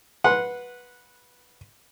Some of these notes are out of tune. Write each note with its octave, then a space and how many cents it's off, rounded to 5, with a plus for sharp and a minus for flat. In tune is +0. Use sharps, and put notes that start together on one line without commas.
B4 -10 F#5 -15 C6 +0